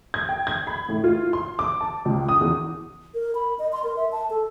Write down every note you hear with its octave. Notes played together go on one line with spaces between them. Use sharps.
G#6
G5
G#6
B5
A2
F4
C6
D6
A5
C#2
D#6
E2
A#4
B5
D#5
C6
A#4
E5
A5
A4